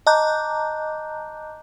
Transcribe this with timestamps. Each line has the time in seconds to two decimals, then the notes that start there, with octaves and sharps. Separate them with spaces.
0.07 D#5 A5 A#5 D6 F#6 G6